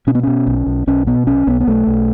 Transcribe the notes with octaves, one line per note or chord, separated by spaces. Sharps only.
B2 C#4
B3
B2 C#4
B1
B1
B1 C#4
B2 B3
B1 C#4
B1 B3
B3
B1 A3
B1